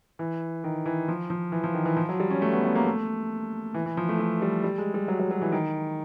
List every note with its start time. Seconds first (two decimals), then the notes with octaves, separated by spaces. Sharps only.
0.19 E3
0.64 D#3
0.86 E3
1.08 F3
1.30 F3
1.52 E3
1.64 F3
1.74 D#3
1.85 E3
1.97 F3
2.09 F#3
2.20 G3
2.30 C#4
2.42 A3
2.53 B3
2.64 B3
2.75 A#3
2.86 A3
3.74 E3
3.86 E3
3.97 F3
4.09 A3
4.19 A3
4.42 G3
4.64 G3
4.78 G#3
4.94 G3
5.08 F#3
5.19 F#3
5.31 F#3
5.42 E3
5.52 D#3